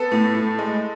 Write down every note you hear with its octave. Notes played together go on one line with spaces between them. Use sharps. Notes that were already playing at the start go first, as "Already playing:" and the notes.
Already playing: B3 A4
A2
A2
G#3